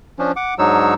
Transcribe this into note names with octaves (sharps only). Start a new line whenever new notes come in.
F3 C#4 D4
F#5 D6
G#2 F#3 D4 D#4 C#5 E6